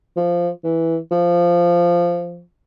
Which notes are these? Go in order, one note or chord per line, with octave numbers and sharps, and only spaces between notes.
F3
E3
F3